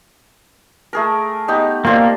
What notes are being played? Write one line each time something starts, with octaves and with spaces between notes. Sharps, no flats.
A3 G#4 A#4
B3 D#4 G4
G3 A#3 C4 F4